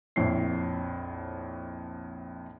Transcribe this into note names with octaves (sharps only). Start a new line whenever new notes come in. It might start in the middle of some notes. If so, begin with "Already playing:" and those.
A#1 F2 E4 C#5 C7